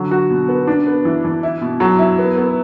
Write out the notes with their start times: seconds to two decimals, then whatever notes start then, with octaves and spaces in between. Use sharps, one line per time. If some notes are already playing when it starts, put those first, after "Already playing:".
Already playing: D3 F#3
0.11 F#4
0.30 B2
0.48 B3
0.67 D4
0.87 B3
1.05 E3
1.25 E3
1.43 E4
1.62 B2
1.80 F#3
1.99 E4
2.18 B3
2.37 B3